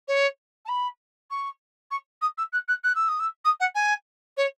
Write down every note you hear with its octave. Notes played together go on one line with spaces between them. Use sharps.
C#5
A5
B5
C#6
C#6
D#6
E6
F#6
F#6
F#6
E6
D#6
E6
D#6
F#5
G#5
C#5